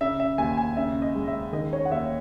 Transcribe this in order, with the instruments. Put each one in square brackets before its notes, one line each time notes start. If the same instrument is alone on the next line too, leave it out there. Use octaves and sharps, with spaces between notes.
[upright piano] C#3 E5
E5
D#2 G#5
G#5
C#3 E5
D#5
G#3
E5
D#3 D#5
C#5
F#5
D#2 E5